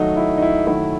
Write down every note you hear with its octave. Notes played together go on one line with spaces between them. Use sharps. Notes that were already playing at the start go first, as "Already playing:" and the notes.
Already playing: D#3 F#3 A3 D#4
E4
D#4
E4
D#3 F#3 A3 E4